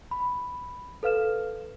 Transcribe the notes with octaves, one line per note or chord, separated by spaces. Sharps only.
B5
A4 B4 F5 F6 E7